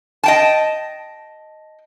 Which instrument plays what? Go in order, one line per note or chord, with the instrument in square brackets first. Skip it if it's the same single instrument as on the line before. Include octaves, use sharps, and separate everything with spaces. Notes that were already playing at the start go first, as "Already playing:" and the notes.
[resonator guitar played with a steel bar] D#5 G5 A5